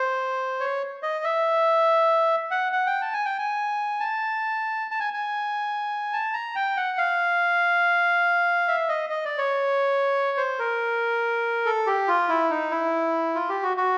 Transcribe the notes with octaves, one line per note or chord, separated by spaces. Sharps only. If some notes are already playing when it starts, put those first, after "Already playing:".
Already playing: C5
C#5
D#5
E5
F#5
F#5
G5
A5
G#5
G5
G#5
A5
A5
G#5
G#5
A5
A#5
G5
F#5
F5
E5
D#5
D#5
D5
C#5
C5
A#4
A4
G4
F4
E4
D#4
E4
F4
G4
F#4
F#4